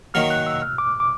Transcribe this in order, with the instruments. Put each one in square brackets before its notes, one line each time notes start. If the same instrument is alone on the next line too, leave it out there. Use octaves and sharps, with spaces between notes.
[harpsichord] D#3 F#3 A#3 [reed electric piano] F6
[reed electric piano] F#6
E6
F6
D6
D6